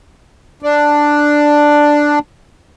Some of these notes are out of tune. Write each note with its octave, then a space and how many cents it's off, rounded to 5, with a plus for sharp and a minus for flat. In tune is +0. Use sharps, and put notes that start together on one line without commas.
D4 +5